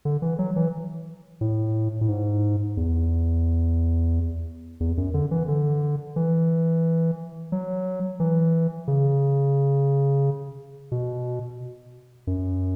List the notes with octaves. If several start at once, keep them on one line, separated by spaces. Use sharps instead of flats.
D3
E3
F#3
E3
A2
A2
G#2
E2
E2
F#2
D3
E3
D3
E3
F#3
E3
C#3
B2
F#2